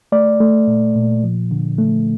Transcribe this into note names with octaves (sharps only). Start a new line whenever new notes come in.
A3 D5
A3
A#2
A#2
F3
D3
A3